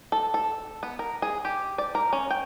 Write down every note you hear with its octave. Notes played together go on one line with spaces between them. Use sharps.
A4
A4
B3
A#4
G#4
G4
D5
A#4
C#4
G5